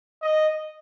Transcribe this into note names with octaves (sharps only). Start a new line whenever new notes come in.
D#5